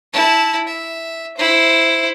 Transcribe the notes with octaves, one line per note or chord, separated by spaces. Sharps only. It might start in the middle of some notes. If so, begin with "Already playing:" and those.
E4 A5
E5
E4 C5